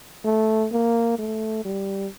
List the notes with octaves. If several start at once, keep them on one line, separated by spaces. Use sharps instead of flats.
A3
A#3
A3
G3